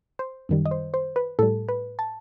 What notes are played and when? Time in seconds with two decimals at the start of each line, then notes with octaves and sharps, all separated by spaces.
0.19 C5
0.49 F#2 D#3 G3
0.65 D#5
0.71 C5
0.94 C5
1.16 B4
1.39 A2 G3 A4
1.69 B4
1.99 A5